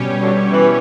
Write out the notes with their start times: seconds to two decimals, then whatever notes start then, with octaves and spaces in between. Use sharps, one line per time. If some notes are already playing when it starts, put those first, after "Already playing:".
Already playing: B2 G3 C#4 G4 C#5
0.20 D3 F#3
0.50 E3